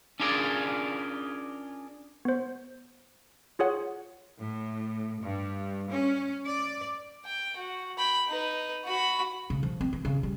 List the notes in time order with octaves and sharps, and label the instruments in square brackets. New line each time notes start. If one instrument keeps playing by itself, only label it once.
[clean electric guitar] C#4 D4 F4 G#4 A#4 D5
[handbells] B3 C5
F4 G#4 C#5 F#5
[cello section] A2
G2
C#4
D5
[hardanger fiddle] G5
F#4
G5 B5
D#4 B4
F#4 B5
[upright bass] C#3
F3
C4
E3
C#3
G3